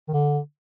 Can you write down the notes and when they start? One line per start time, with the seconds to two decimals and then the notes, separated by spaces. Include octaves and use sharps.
0.08 D#3
0.13 D3